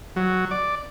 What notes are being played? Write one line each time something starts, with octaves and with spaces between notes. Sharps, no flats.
F#3
D5